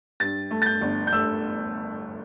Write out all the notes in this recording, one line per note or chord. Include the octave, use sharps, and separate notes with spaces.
G2 A6
A3
A6
G6
G1
G6
A3 E6